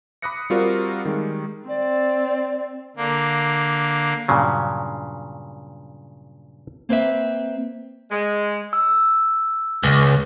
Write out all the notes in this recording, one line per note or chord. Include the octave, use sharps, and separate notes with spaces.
B5 D6 D#6 F#6 A#6 C#7
G3 C4 F4 F#4 A#4 D5
D#3 G3 G#3
C4 D5
D3 A#3
G2 A#2 C#3 F#3
A#3 C4 B4 E5
G#3
E6
C#2